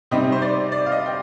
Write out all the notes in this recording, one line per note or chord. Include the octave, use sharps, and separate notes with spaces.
C3 G3 C4 D#4 D#5
C5
D5
D5
F5
D#5
G5